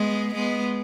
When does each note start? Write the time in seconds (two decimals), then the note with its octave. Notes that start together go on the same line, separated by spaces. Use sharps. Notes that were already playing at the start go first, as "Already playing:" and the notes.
Already playing: G#3 B3
0.35 G#3 B3